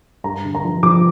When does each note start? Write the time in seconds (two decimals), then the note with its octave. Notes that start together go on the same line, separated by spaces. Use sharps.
0.24 G2 A#5
0.44 D3
0.55 A#5
0.64 F3
0.83 F3 D6